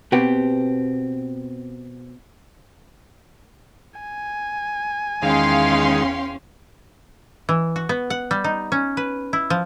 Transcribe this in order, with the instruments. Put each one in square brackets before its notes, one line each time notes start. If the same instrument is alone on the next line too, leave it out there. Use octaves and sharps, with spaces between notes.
[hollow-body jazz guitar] B2 B3 C4 G4
[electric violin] G#5
[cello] E2 C#4 [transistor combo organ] D#3 G#3 [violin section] F5 G5 C6
[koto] E3
F#4
B3
F#5
G3
D#4
C#4
B4
E4
F3